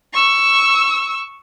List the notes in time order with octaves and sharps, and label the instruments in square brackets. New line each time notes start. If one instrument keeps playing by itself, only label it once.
[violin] C#6 E6